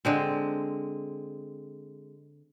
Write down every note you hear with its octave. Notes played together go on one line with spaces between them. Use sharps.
D3 G#3 C4